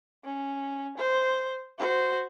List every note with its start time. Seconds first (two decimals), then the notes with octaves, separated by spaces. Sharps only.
0.24 C#4
0.97 C5
1.78 F#4 C5